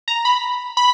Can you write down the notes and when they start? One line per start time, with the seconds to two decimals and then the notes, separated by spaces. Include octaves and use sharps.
0.08 A#5
0.25 B5
0.77 B5